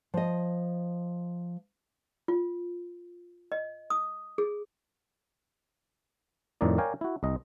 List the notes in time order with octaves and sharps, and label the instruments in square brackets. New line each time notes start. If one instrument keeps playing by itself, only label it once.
[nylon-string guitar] F3 D#5
[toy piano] F4
D#5
D#6
G#4
[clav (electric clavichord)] F2 A2 D#3 A3 D#4 D5
A#4 C#5 D5 F5 G5 G#5
E4 F#4
C2 D#5